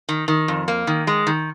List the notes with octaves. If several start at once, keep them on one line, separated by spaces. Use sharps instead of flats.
D#3
D#3
F2
A#3
D#3
G#3
D#3